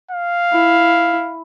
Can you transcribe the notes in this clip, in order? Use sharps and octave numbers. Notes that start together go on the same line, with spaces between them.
F5
E4